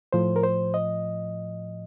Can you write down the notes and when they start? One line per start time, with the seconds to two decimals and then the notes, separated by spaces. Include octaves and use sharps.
0.13 A2 F3 C5
0.36 A#4
0.43 C5
0.74 D#5